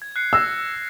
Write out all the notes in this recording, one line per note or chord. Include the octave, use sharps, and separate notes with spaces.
G#6
F#6 C7 C#7
E6 F6 A#6